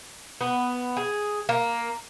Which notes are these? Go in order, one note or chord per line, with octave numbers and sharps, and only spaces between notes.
B3
G#4
A#3